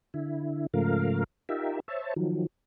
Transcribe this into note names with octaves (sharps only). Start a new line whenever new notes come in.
D3 E4
G#2 C#3 F3 A3 A#4 F5
D#4 F4 G4 A#4 E5
C5 C#5 E5 A5
D#3 F3 F#3